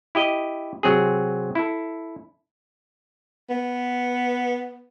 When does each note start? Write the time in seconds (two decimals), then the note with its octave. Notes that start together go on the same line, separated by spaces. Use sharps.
0.15 E4 G4 D#5
0.83 C3 F#3 C4 G#4
1.55 E4 A4
3.50 B3